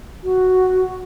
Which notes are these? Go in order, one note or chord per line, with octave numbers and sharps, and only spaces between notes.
F#4